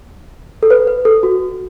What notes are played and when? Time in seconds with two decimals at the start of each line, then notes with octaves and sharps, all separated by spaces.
0.63 A4
0.70 B4
0.87 B4
1.05 A4
1.23 F#4